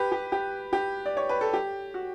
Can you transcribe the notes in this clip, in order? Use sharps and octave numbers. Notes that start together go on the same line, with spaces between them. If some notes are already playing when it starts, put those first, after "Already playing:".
Already playing: G4 B4
G4
G4
G4
D5
C#5
B4
A4
G4
F#4